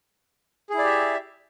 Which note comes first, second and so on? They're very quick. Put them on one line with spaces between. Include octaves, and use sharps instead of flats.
G#4 E4 D5 G4 E5